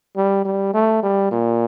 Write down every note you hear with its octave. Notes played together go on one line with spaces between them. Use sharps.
G3
G3
A3
G3
A#2